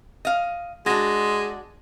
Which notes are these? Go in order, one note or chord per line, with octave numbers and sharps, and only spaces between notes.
D#5 F5
G#3 D4 F#4